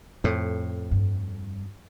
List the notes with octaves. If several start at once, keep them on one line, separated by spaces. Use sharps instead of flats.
F2 A2
G2